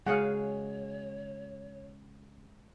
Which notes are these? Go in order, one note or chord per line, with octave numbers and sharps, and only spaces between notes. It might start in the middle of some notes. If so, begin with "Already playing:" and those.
C#3 G#3 F#4 G#4 C#5 F5 F#5